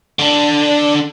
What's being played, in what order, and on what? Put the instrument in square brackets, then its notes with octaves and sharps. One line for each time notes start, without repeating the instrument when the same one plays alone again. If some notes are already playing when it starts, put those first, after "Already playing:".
[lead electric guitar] D3 D4